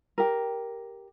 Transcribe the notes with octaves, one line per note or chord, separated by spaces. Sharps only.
G4 A#4